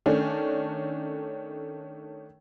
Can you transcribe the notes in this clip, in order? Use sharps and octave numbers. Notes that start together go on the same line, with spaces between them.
D#3 A3 C#4 D4